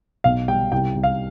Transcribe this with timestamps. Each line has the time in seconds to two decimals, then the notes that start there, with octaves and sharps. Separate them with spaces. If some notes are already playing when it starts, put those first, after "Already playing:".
0.24 B1 F5
0.48 G3 G5
0.72 C2 G5
0.96 C2
1.03 F5